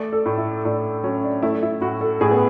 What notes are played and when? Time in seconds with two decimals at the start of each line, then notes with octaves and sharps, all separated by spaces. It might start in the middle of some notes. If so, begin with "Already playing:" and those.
Already playing: A3 D5
0.13 A4
0.26 A2
0.38 E4
0.65 A2 D4
1.04 F#3 C#4
1.24 D4
1.43 A3 E4
1.63 E4
1.81 A2 F#4
2.01 A4
2.21 A2 G#4
2.31 B3